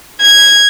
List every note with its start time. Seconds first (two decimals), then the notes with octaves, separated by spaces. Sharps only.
0.23 G#6